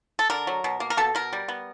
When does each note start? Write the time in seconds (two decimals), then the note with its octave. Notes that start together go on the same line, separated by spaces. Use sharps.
0.19 A4
0.30 D3 A#4
0.47 F#3
0.64 B2
0.80 A#3
0.90 A#4
0.97 B2 A4
1.15 B2 A#4
1.33 G3
1.48 B3